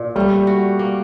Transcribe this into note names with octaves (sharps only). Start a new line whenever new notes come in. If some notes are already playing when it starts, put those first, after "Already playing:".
Already playing: A#2
G3 A3
F#4
A#3